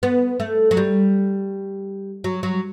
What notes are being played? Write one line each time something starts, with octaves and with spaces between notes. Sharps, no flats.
B3
A3
F#3
G3
F#3
F#3